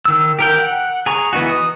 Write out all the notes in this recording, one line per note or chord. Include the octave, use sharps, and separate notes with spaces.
D#3 E6
G4 A#4 G5
F#5
G#4 A#5 C#6
E3 B3 D#4 F#4
D#6